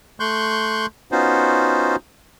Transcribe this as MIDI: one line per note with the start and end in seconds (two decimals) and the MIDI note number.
0.20 0.86 57
0.20 0.86 84
0.20 0.86 85
0.20 0.86 90
0.20 0.86 91
1.12 1.96 59
1.12 1.96 61
1.12 1.96 63
1.12 1.96 65
1.12 1.96 66
1.12 1.96 72